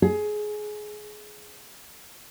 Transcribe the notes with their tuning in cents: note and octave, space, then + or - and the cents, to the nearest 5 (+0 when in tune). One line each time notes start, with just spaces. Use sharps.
G#4 +20